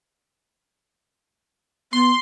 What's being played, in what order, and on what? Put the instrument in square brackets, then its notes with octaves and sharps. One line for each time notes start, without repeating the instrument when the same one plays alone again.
[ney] B3 [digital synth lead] C6